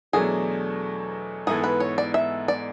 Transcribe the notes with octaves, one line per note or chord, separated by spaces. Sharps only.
E2 B2 F#3 A3 D4 G#4
G#2 E3 B3 E4 G#4 A4
B4
C#5
D5
E5
D5